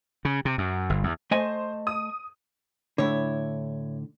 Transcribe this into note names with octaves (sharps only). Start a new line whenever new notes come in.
C#3
C3
F#2
G1
E2
A3 C5 D#5 G#5
D#6
A2 D3 E4 C#5